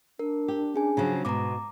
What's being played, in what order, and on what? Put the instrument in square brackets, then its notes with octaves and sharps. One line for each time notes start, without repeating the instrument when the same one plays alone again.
[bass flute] D4 [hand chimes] A#4
[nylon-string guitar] G4
[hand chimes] C#4 G#4 G#5
[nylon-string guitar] C#3 F3 F#3
[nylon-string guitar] G#2 B2 [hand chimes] A#5 D6